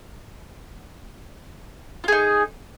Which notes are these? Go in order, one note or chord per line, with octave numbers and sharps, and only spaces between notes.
D#4 F4 G#4